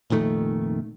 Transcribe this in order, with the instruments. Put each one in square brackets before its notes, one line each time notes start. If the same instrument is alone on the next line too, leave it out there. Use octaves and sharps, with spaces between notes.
[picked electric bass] F1 A#2 D#3 A3